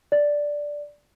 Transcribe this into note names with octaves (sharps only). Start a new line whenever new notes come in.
D5